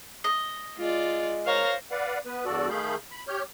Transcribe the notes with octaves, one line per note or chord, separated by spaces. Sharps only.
D#5
G#3 F4 D5
A#4 C5 C#5 F5 A#6
B4 D5 F5 F#5
B3 B4
E2 G2 F#4 A4 D5
D#3 A3 G#4 F5 B5 G6
B5
G4 C#5 F6 G6